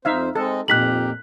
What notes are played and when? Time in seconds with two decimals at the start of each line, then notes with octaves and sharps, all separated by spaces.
0.05 F2 D#4 C5 E5 F5
0.35 G#3 C4 A4 D#5
0.68 F2 A#2 D#4 G4 A#4 F#6 B6 F#7